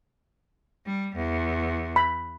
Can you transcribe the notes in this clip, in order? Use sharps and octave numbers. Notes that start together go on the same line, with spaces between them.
G3
E2
B5